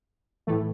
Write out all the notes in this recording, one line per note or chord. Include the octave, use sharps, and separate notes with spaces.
A2 E3 A3